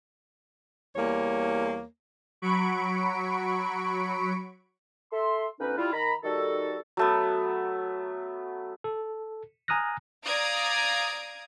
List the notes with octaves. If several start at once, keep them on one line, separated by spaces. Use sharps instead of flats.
E2 G3 A#3 C#5
F#3 B5 C#6 D7
A4 E5 C6
D2 B3 C#4 D#4 B4
G3 E4 F4
D#3 A#5 B5
D#3 G3 D#4 F#4 A4
F#3 A3 B3
A4
G#5 A#5 D#6 F6 F#6 A#6
D5 F5 A#5 D#6 G#6 D7